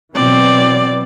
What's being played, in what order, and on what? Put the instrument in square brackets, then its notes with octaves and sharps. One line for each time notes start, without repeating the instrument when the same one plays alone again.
[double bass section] B2 E3 F#3 [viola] C4 D5